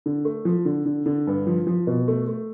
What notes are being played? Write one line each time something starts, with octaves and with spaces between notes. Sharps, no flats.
D3
A3
F3
D3
D3
D3
G2
F3
F3
B2
A3
A3